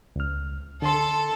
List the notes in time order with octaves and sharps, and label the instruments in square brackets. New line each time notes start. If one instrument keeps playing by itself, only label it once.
[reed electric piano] C#2 F6
[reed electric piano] D3 C6 [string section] A4